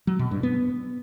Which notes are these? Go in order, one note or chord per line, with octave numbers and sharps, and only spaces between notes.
F#3
B2
G2
B3